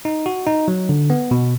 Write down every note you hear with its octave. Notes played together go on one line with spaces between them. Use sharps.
D#4
F#4
D#4
F#3
D3
B3
B2